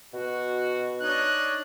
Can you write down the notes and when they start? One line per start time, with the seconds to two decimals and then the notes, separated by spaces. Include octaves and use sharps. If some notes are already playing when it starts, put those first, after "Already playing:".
0.14 B2 F#4
1.01 D4 D#4 C#5 F#6